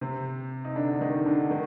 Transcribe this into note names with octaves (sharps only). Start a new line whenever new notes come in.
C3 C4
D#4
D3 D4
D#3 D#4
D3 D4
D#3